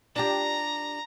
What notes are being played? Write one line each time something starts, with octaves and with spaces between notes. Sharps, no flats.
D4 F4 G4 A#5